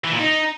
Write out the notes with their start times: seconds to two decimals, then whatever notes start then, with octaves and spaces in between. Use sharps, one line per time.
0.04 E3
0.12 A#2
0.20 D#4